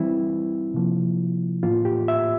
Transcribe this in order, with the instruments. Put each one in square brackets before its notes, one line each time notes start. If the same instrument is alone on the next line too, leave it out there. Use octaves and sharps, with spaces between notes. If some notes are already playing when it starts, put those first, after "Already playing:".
Already playing: [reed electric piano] E3 G3 C4 E4
C3 F3 A#3
A2 E3 A#3 F4
G4
E5